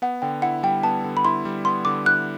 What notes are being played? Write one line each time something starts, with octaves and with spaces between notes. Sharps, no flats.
B3 F#5
D3 G5
E4 F#5
G3 G5
B3 A5
D3
B5
E4 C6
G3
B3 C6
D3 D6
E4 F#6